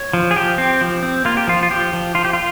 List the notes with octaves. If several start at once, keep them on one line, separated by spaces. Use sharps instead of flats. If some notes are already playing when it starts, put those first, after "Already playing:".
Already playing: C#5
F3
G#4
F3 G4
C4
F3
C4
A#3 F4
G4
F3 F4
F4
F3 G4
F3
F3 F4
G4
F4